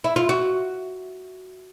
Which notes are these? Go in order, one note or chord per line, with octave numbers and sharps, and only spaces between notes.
E4
F4
F#4